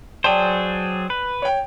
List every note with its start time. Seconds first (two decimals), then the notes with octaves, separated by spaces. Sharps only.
0.24 F#3 G#4 C5 D5 G5 A5
1.10 B4
1.42 C#5 G5